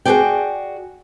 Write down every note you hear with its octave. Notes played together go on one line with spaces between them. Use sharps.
F#4 G#4 A4 B4 D5 G5